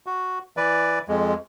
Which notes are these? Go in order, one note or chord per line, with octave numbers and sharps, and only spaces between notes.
F#4
E3 B4 D5
F2 G#3